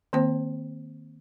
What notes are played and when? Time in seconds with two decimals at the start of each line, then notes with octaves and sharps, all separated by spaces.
0.13 D#3 A#3 C4 C5